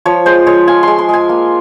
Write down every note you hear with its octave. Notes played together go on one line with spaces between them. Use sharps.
F3 C#5
G#3 C5
G#3 C#5
F4 G#5
G#3 C6
C6
G#3 G#5
A#3